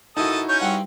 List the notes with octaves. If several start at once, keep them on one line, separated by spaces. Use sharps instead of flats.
A#1 D#4 E4 F#4 A4 G#5 A5 D#6
C#4 C#5 G6
G2 C4 F#5